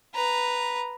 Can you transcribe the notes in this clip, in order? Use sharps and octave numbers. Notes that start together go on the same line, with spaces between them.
B4 A#5